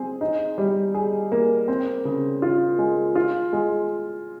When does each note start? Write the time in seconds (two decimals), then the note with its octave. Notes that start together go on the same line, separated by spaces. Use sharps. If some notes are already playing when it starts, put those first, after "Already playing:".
Already playing: C4 G#4
0.21 D#4
0.58 G3
0.94 G#4
1.32 A#3
1.68 C4
2.05 C#3
2.42 F4
2.78 G#3
3.15 F4
3.53 G#3